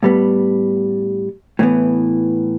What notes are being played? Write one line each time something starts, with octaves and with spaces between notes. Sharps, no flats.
A2 G3 B3
A2 E3 B3